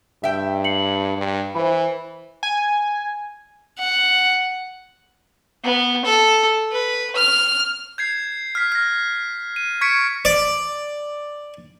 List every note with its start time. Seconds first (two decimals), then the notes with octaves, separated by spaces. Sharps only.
0.24 G2 E5 G5
0.64 C7 C#7 F#7
1.17 G2
1.55 E3 C5 B5
2.43 G#5
3.79 F#5
5.64 B3
6.05 A4
6.72 B4
7.16 F6
7.98 G6 G#6 C7
8.55 F6 B6
8.72 F6 A#6
9.56 D#7
9.81 C#6 G#6 B6 C#7 D7
10.25 D5